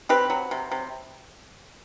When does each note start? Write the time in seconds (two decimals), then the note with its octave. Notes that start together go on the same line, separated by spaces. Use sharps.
0.09 C4 G4 B4
0.30 F#3
0.51 C3
0.72 C3